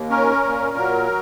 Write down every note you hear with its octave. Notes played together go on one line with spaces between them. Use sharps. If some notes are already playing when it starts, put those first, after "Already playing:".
Already playing: D#2
C#4 A#4
A#2
F#3